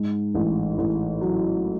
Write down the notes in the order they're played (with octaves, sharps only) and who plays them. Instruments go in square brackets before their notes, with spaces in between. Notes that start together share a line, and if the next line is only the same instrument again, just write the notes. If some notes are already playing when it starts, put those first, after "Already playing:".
Already playing: [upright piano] G#2
A1
A1
F#3